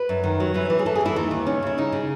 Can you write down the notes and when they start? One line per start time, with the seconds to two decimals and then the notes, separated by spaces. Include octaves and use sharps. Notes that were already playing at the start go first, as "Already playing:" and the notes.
Already playing: B4
0.09 F#2
0.24 D#3
0.40 F#3
0.54 E3 B4
0.70 E3
0.79 G#4
0.86 E3 A4
0.95 G#4
1.01 F#2 E4
1.16 D#2 D#4
1.31 D#2
1.47 C#3 C#4
1.63 C#3 E4
1.78 C#3 D#4
1.92 C#3